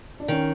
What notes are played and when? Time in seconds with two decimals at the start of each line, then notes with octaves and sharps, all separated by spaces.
0.20 D4
0.28 D#3 C#4